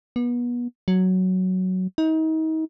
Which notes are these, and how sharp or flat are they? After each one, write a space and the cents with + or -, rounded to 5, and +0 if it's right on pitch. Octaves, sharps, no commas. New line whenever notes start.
B3 -30
F#3 +5
D#4 +35